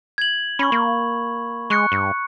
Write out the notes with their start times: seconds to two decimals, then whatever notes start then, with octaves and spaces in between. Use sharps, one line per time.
0.18 G#6 F#7
0.59 C#4 B5 C#6
0.72 A#3
1.70 G#3 C#6 F#6 C#7
1.92 G2